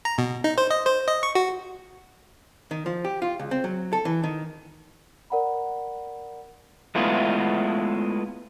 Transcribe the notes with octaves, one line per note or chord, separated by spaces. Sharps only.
A#5
B2
D#4
C5
D#5
C5
D#5
C#6
F#4
D#3
F3
G4
F4
C#2
C4
F#3
A4
E3
D#3
A#4 D5 F#5 A#5 B5
G#3 A3 B3 E4 F4